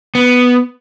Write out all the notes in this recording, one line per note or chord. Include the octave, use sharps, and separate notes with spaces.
B3